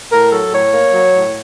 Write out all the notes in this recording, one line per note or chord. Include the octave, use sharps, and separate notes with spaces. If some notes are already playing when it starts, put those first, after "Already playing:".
A2 A#4
F#3 A4
A2 C#5
A#3
F#3
A2